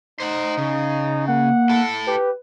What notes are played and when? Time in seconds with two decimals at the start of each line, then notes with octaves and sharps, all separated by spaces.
0.20 D#4 C5 F#5
0.57 C#3
1.28 A#3 F#5
1.70 E4 A4
2.07 G4 B4